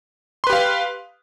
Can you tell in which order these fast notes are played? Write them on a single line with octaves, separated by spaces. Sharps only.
C6 B4 G4 F5